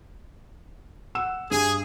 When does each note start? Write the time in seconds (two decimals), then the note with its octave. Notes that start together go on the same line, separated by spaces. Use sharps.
1.15 F#5 E6 E7
1.51 G2 G#4